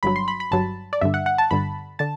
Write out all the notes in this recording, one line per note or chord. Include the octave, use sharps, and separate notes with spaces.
G1 G2 F#3 B5
C6
B5
B5
G1 G2 F#3 A5
D5
G1 G2 D3 E5
F#5
F#5
A5
G1 G2 D3 B5
D3 A5